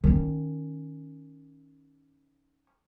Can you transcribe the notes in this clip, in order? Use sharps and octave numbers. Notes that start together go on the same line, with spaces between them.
D#3 C#4